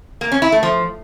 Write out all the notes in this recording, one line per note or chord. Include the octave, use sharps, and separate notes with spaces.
A#3
C#4
E4
A3
F3